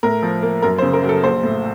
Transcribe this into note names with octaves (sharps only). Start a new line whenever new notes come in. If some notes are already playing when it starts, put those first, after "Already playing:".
A2 A#4
F3
A#3
F#2 A#4
C5
C#3
A#4
F#3
A4
A#1 C5
A2